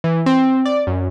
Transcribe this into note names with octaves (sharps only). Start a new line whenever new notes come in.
E3
C4
D5
F#2